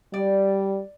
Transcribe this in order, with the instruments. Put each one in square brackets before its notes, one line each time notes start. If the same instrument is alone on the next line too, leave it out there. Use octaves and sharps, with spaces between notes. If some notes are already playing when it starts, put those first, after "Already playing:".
[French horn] G3 [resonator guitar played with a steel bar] D5